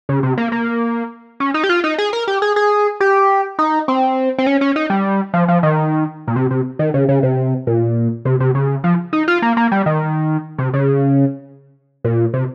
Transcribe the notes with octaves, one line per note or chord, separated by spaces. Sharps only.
C#3
C3
A#3
A#3
C#4
D#4
G4
F4
D#4
G#4
A#4
G4
G#4
G#4
G4
D#4
C4
C4
C#4
C#4
D#4
G3
F3
F3
D#3
A#2
C3
C3
D#3
C#3
C#3
C3
A#2
C3
C3
C#3
F3
D#4
F4
A#3
A#3
G3
D#3
C3
C#3
A#2
C3